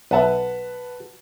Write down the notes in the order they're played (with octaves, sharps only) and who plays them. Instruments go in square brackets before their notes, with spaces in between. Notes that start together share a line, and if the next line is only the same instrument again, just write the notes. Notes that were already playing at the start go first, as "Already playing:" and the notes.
[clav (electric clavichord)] B1 E5 [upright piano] B4 F#5 A5